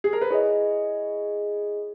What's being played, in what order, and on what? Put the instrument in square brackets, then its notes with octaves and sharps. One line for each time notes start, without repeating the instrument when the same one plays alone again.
[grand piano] G#4
A#4
B4
[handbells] E4 G#4 D#5 [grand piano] C#5